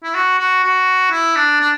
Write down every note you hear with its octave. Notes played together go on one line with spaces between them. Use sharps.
E4
F#4
F#4
F#4
E4
D4
D4